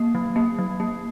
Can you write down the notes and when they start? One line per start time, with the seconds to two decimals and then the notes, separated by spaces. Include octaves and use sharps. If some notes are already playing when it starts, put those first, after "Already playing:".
Already playing: A#3
0.15 F#3
0.36 A#3
0.59 F#3
0.80 A#3